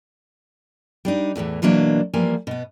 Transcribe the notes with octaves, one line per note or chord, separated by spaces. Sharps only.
G3 D4 D#4
E2 A2 D#3 E3
B2 E3 F#3 A#3 D4
E3 F3 G3 A#3 G#5
B2 B3